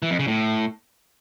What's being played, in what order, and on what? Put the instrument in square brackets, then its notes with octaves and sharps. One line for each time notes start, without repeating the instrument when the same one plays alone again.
[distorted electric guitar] E3
F2
C#3
A2